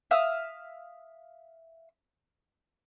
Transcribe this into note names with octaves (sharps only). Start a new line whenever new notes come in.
E5 F5 D#6 E6